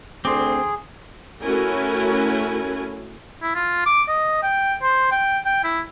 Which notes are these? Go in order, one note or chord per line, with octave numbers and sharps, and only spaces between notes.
D2 C4 G#4 C6 D6
A3 C#4 E4 F#4 A#4 G#5
E4
F4
D6
D#5
G5
C5
G5
G5
E4